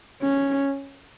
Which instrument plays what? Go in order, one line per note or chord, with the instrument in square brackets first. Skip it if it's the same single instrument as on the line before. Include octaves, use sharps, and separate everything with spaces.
[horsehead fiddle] C#4